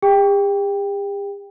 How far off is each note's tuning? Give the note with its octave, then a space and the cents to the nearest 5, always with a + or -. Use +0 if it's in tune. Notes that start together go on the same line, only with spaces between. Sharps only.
G4 +45 G5 +10